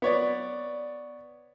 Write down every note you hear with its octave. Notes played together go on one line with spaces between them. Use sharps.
B3 C#5 D5